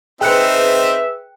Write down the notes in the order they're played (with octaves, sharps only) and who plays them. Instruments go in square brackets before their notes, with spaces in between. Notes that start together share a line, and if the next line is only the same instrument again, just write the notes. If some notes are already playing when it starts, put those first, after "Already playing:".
[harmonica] C4 D#4 [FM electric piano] G#4 B4 [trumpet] E5 [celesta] G5 F#6 C#7